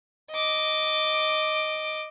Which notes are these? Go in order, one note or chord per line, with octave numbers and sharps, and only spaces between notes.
D#5 D6